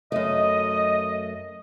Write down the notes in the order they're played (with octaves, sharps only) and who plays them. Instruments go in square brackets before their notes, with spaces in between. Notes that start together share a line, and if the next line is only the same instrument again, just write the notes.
[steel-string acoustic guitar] F#2 A3 [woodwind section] D#5